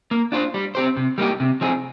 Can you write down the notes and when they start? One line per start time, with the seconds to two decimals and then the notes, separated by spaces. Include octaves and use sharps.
0.11 A#3
0.32 D4 F4 C5
0.54 G3
0.75 C4 G4 C5
0.97 C3
1.18 G3 A#3 D#4 G4
1.40 C3
1.61 F3 C4 D#4 G#4